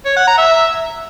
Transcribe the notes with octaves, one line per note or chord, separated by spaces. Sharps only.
C#5
F#5
A#5
E5